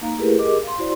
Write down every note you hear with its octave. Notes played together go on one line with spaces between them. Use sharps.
A#3 D#4 F5 A#5
A3 E4 G4 G#4 A#4 B4
G4 G#4 A#4 D#5 D6
F5 C6
E4 F#4 C5 D5 C6